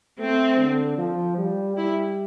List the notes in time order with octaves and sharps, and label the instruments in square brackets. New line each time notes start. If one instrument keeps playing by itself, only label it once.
[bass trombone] A3 [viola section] C4
[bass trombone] D3
F3
G3
[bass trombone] G3 [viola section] E4